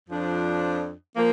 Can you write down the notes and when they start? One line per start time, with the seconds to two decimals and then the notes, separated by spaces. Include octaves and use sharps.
0.09 F2 F3 D4
1.15 F3 A#3